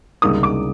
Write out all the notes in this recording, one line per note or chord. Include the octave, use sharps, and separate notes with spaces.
C#2 C3 D#3 G3 A#3 D#6
D6